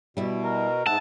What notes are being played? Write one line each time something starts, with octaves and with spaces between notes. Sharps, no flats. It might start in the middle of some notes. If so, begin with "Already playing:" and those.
B2 G3 E4
A#4
G#2 E5 F#5 A5